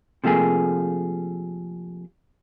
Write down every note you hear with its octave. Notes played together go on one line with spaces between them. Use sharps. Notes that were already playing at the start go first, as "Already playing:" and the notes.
C3 F3 A3 A#3 G#4